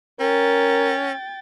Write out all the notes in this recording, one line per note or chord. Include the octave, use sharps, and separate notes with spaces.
C#4 A#4 G5 A6